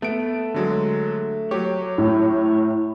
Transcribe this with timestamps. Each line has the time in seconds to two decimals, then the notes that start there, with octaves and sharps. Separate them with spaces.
0.02 A3 B3 D7
0.54 D3 F#3 G#3
1.51 F#3 G4 C#5
1.98 A2